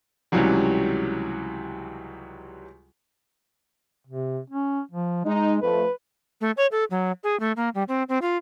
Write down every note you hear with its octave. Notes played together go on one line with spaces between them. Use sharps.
C#2 C3 E3 F#3 G3
C3
C#4
F3
G#3 D#4
F2 A3 B4
A3
C#5
A4
F#3
G#4
A3
A#3
G3
C4
C4
F4